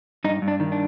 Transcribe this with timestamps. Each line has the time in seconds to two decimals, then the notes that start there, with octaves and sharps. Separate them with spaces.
0.24 G2 D#4
0.42 G2
0.48 D4
0.60 D#3
0.72 D4